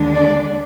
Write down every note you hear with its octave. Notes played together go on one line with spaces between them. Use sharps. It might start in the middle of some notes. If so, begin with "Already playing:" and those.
Already playing: D#2 D3 G#3 D4
D5